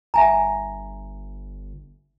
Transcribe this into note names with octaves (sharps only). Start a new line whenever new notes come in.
G1 E5 G#5 A#5